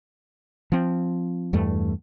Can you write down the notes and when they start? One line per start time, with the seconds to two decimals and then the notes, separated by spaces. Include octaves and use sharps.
0.72 F3 C4
1.53 E2 G2 A3